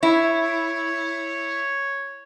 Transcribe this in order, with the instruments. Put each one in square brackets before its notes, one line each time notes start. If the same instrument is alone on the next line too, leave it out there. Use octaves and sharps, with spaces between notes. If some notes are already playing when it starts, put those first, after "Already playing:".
[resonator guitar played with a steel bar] E4 [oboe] C#5